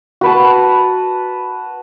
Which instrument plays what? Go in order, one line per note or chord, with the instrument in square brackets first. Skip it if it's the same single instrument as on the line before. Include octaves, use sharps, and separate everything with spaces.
[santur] F#4 B4 A5